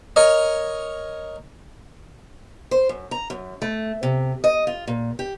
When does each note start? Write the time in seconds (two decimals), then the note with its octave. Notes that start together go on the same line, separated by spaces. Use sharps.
0.16 A#4 C#5 D#5
2.71 C5
2.89 F#2
3.11 A#5
3.30 F#2
3.62 A3
4.03 C3
4.44 D#5
4.67 F4
4.87 A#2
5.19 G4